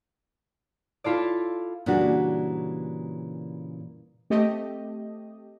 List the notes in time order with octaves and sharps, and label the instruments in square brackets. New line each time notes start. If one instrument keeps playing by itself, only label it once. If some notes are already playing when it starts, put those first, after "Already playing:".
[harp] E4 F4 A4 D5
[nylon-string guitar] A#2 C#3 E3 G3 D4 F#4
[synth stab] A3 C4 G4 D#5